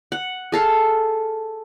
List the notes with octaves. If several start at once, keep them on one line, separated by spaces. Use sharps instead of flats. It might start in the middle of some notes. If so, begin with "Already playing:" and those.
F#5
G#4 A4 F5